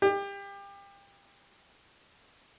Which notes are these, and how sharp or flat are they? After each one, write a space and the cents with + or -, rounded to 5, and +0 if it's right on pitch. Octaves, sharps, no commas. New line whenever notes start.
G4 +30